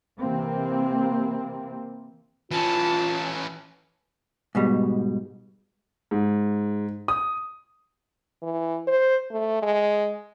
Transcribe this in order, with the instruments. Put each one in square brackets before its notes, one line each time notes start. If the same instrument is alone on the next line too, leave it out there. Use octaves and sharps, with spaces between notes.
[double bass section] C3 E3 A#3 C4
[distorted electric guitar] E3 C#4 [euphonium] F4 [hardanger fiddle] A5
[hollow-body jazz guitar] G#2 B2 G3
[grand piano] G#2
D#6
[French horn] E3
C5
A3
G#3